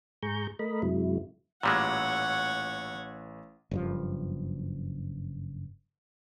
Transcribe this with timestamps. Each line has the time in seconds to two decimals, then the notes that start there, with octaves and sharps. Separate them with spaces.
0.22 G#2 G#4 A#5 C#6 G6
0.59 A3 A#4 D#5 B5
0.82 F#2 C3 F#3 G#3 E4
1.63 A1 A#2 G3 G#3 C#5 F#5 E6
3.71 F#1 G2 F3